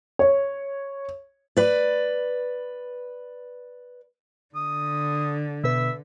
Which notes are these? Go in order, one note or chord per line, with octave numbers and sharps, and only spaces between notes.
C#5
B4 D5
D3 D#6
B2 B4 E5